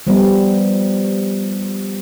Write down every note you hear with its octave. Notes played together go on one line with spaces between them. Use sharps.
F3 G3 B3